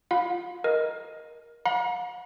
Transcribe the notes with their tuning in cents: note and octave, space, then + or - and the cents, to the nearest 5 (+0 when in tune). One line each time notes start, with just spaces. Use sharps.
F4 +0 F5 +35 B5 +0
A#4 +15 D#5 +0
F#5 -45 A#5 +45